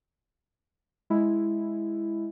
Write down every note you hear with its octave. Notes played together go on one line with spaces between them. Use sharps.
G#3 E4